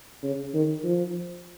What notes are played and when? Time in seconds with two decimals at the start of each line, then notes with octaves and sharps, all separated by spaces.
0.23 C#3
0.54 D#3
0.84 F3